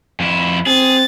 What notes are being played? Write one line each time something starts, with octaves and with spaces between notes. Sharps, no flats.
F2 E4
C4 G#4 A6